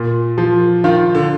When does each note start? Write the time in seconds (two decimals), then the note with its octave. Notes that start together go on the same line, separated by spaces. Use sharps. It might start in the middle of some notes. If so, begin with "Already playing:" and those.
Already playing: A#2
0.38 F3
0.84 D#3 F4
1.15 D3